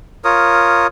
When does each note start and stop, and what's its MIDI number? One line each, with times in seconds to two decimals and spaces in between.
0.24 0.87 65
0.24 0.87 70
0.24 0.87 73
0.24 0.87 87